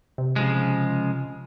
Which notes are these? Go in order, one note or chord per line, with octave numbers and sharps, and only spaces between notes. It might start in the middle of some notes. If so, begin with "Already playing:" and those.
C3
C#3 F3 G#3